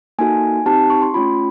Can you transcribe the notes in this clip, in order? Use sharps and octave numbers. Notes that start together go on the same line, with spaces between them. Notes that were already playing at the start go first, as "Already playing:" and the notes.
A#3 D#4 F#4 A4 G#5
C4 D#4 G4 A5
C#6
C6
A3 C#4 F4 B5